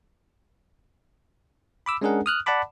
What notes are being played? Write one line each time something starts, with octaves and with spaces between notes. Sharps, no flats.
B5 D6 E6
G#3 C#4 D4 G#4 A#4 F#5
D#6 F6 F#6
D5 F#5 A5 B5 D6